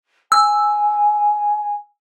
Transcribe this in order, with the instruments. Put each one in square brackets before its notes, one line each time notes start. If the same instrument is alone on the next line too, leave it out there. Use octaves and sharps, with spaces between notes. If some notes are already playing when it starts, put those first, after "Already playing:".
[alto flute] G#5 [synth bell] E6